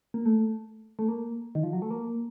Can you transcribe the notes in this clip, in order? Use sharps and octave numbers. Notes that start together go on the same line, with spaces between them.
A#3
A3
A3
A#3
D#3
F3
F#3
A3
A#3